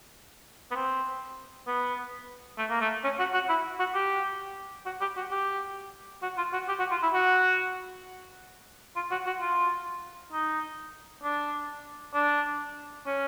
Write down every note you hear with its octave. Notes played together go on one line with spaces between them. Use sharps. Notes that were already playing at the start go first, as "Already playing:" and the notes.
B3
C4
B3
A3
A#3
A3
C#4
F#4
F#4
E4
F#4
G4
F#4
G4
F#4
G4
F#4
F4
F#4
G4
F#4
F4
E4
F#4
F4
F#4
F#4
F4
D#4
D4
D4
C#4